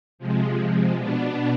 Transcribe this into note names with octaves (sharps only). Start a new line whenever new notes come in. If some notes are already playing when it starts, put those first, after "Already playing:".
C3 F3 G#3
B2 B3 D4